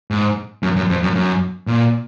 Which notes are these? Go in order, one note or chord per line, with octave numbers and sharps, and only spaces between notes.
G#2
F#2
F#2
F2
F#2
F#2
A#2